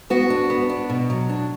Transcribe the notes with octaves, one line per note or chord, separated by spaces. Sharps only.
B3 F#4
D4
B3
D4
B2
F#3
D4